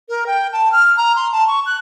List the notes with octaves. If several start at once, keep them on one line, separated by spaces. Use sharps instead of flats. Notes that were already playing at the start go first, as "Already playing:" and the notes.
A#4
G5
A5
F6
A#5
C6
A5
C#6
F#6